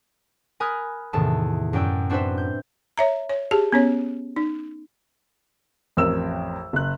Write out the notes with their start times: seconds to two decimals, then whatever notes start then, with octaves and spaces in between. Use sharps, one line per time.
0.60 A#4 G#5 B5 D#6 F6 F#6
1.13 E2 A2 C3 D#3 A5 E6
1.73 F#2 F#3 D5 G5 E6
2.10 C4 D4 F#4 B4 C5 E5
2.38 G6
2.98 C#5 E5 A#5
3.29 C#5
3.51 G4 G#4 A5
3.72 B3 C#4 C#5
4.36 D#4
5.97 A1 F2 A#4 E6 E7
6.73 F#1 F#6